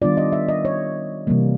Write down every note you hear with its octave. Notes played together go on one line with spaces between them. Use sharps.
D#3 G3 B3 D4 F4 D5
D#5
E5
D#5
C#5
C3 E3 G3 A#3